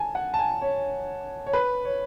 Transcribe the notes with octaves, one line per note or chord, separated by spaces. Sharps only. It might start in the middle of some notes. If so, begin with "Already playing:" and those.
Already playing: G#5 A5
F#5
A5
G#5
C#5
C#5
B4
C#5